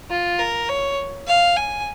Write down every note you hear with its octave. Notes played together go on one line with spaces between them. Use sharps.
F4
A#4
C#5
F5
G#5